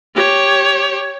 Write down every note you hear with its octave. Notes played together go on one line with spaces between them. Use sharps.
G4 C#5